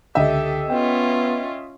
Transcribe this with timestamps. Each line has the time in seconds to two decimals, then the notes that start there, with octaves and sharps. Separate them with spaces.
0.15 C#2 D3 G4 A4 D#5 E5 G5
0.70 B3 C#4 F4 G5